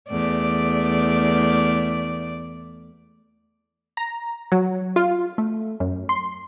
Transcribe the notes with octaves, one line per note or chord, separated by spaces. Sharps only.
E2 A3 D5
A#5
F#3
F4
A3
F#2
C6